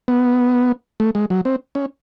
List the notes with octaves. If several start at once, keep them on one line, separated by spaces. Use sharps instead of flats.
B3
A3
G#3
F#3
C4
C#4